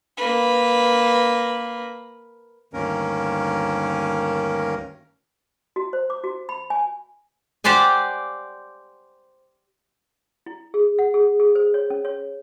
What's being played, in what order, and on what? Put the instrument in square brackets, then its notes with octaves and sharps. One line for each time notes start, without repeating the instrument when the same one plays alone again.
[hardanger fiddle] A#3 B4
[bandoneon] D2 G2 D#3 A#3 C#4 A#4
[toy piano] F#4
C5
D6
F#4
B5
G#5
[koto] G4 C5 D5 F#5 G#5
[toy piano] E4
G#4
F#5
G#4
G#4
C5
C#5
C#4
C#5